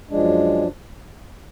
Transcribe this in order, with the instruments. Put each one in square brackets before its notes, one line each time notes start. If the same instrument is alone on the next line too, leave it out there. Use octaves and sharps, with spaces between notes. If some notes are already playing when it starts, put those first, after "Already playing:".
[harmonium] F#2 F3 G#3 D4